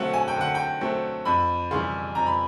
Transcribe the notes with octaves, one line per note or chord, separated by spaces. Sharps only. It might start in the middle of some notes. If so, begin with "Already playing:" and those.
Already playing: D3 F#3 A3 C4 F5 F#5
G#5
G5
D3 F#5
G5
F#3 A3 C4
F2 B5
C#3 E3 G3 C6
F2 A#5
B5